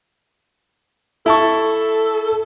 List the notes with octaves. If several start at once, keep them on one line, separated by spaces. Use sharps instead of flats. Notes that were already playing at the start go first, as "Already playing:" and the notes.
E4 A4 A5 C#6